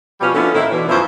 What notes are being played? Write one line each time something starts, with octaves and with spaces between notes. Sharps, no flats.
B2 F3 G3 C#4
D3 F3 A#3 B3 C#4 E4
A2 D#3 C4 E4
B2 D3 E3
F#2 F3 E4 C5